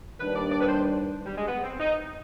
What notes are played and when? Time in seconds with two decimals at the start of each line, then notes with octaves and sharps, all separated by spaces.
0.19 D#2 D#3 G3 D4 B4
0.35 D5
0.51 D5
0.61 B4
0.67 C5
1.25 G3
1.37 G#3
1.47 B3
1.63 C4
1.79 D#4